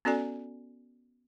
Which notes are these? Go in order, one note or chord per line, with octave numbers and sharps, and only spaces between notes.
B3 C#4 F#4 A4 D5 G#5